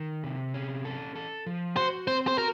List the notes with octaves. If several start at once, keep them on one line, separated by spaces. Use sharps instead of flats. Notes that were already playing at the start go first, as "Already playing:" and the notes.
Already playing: D#3
C3
C#4
A4
A4
F3
F#4 C5
C4 C5
C5
F#4 A#4